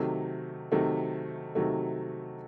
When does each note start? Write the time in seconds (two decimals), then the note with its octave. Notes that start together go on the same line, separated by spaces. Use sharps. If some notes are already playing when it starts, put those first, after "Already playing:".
Already playing: C3 D#3 F#3 A3
0.72 C3 D#3 F#3 A3
1.55 C3 D#3 F#3 A3